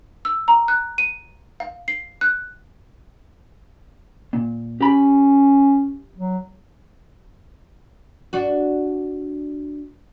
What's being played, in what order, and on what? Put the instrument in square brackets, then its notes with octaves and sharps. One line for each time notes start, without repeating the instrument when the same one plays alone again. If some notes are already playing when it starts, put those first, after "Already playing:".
[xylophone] E6
A#5
F#6
D#7
F5
C7
F#6
[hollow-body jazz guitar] A#2
[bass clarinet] C#4 [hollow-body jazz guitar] G4 B5
[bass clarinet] F#3
[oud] D4 F#4